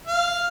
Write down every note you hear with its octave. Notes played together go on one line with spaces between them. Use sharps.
F5